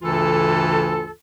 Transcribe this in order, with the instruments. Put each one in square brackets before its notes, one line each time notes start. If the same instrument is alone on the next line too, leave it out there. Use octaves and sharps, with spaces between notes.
[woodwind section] D2 G2 C#3 E3 F4 A4